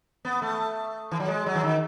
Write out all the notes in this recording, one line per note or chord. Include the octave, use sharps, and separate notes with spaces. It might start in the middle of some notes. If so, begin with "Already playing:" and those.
B3
A3
E3
F#3
G#3
F#3
E3
D#3